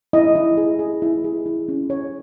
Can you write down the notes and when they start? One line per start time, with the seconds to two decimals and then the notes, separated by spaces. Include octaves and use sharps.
0.13 E4 D#5
0.36 E4
0.57 G#4
0.79 G#4
1.02 E4
1.24 G#4
1.46 E4
1.68 C#4
1.90 C#5